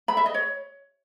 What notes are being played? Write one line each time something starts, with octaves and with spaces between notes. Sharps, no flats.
B5
E5
D#5
C#5